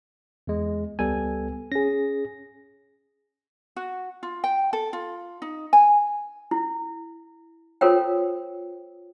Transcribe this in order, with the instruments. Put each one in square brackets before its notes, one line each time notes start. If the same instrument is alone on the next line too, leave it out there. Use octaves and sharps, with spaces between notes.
[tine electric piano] E2 G#3
[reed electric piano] C#2 B3 [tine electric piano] G3 A4 G#5
[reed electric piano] C#4 G#4 [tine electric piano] A#6
[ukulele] F#4
F4
G5
A4
F4
D#4
G#5
[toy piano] E4
F4 A4 A#4 C5 C#5 G5